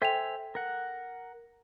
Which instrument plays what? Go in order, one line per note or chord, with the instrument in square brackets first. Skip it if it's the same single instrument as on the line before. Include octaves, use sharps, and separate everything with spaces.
[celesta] A4 G5 F7 [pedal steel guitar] C5 E5 G#5
[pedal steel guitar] A#4 F#5